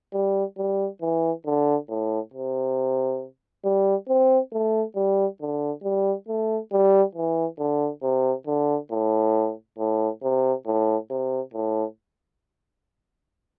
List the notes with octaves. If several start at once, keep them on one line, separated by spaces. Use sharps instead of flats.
G3
G3
E3
D3
A2
C3
G3
C4
A3
G3
D3
G3
A3
G3
E3
D3
C3
D3
A2
A2
C3
A2
C3
A2